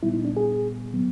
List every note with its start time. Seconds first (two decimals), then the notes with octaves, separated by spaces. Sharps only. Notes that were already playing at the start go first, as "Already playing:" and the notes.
0.03 A#2 G3 B3 E4
0.14 D#4
0.25 D4
0.37 G#4
0.93 A2 F#3 B3